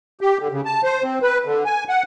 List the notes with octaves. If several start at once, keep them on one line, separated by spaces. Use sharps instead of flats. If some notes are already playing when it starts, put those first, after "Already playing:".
G4
D3
C#3
A5
C5
C4
B4
D3
G#5
F#5